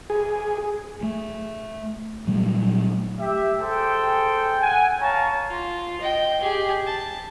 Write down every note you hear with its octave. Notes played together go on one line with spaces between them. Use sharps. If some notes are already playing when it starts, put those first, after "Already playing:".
G#4
A3
A#2 F#3 G3 A3
G4 E5
G#4 A4 C5 G5
F#5 G#5
C#5 F5 A5 A#5 C#6
F4
D#5 G5
G4 G#4
A5